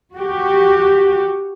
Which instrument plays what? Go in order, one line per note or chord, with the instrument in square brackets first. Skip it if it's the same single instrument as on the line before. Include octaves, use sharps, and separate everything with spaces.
[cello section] F#4 G4